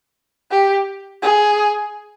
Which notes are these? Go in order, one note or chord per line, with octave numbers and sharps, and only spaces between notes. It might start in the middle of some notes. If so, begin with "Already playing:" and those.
G4
G#4